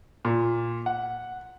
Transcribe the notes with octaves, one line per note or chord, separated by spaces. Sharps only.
A#2
F#5